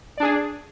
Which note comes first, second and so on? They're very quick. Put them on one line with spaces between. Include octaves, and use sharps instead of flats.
D5 D4 G#4